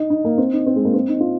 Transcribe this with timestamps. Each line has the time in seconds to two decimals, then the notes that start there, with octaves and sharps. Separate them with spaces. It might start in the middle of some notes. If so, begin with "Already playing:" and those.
Already playing: D#4
0.10 D#4
0.25 A#3
0.38 C4
0.53 D#4
0.66 C4
0.76 G#3
0.85 A#3
0.94 C4
1.08 D#4
1.20 F4